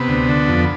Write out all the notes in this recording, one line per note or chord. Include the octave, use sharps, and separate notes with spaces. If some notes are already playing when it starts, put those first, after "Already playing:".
Already playing: C3 B3
D2
D3
F2